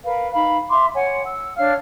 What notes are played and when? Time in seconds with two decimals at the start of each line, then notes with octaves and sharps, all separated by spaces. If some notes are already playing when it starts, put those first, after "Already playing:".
0.05 A#4 B4 F5
0.33 D#4 F5 B5
0.69 E5 C6 D6
0.94 C#5 F#5 G#5
1.25 E6
1.58 D4 C#5 F5 F6